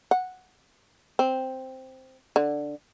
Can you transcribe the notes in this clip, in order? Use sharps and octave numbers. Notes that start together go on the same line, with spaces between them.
F#5
C4
D3